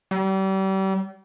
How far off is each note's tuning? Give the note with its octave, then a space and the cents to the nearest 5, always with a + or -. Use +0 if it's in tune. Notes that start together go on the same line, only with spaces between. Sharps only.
G3 -35